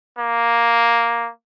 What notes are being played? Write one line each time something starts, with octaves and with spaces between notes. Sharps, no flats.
A#3